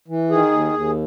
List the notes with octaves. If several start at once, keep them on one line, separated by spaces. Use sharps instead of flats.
E3
D#3 G#4
D#2
D#2